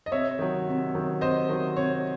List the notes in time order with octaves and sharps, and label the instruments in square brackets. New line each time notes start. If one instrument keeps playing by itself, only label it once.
[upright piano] D#5
C3 C#5 E5
D#3 F#3
C3
D#3 F#3
C3 C5 D#5
D#3 F#3
C3 C#5